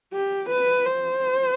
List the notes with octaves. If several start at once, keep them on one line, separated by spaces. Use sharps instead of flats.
G4
B4
C5